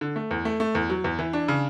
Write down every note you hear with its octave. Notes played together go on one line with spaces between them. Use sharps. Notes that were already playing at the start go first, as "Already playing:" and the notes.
D3
A3
E2
A3
A3
E2
F#3
E2
E3
D4
C#3